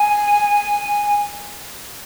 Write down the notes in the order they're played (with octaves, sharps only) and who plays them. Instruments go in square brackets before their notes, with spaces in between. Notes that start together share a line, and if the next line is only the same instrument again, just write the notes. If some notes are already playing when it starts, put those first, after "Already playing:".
Already playing: [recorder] G#5